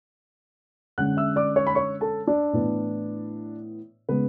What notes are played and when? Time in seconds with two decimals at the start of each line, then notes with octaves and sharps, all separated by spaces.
0.98 D3 G#3 C#4 F#5 F#6
1.17 E5 E6
1.36 D5 D6
1.56 C#5 C#6
1.67 B5
1.75 C#5 C#6
2.01 A4 A5
2.27 D4 D5
2.53 A2 E3 B3
4.09 C#3 G#3 B3 C#4 B4